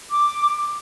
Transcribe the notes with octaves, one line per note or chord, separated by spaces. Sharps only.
D6